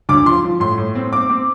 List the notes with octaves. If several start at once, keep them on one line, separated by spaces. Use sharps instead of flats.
D2 D6
F3 C6
F3
A2 C6
A2
C4
C4 D6
C4